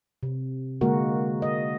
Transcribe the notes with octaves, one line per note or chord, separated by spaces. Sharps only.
C3
D3 G#3 A#3 F#4 A#4
D#5